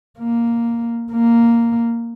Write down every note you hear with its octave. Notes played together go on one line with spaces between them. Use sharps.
A#3
A#3